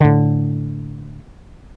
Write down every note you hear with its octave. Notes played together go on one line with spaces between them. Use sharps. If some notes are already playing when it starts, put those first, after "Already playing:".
A2 D3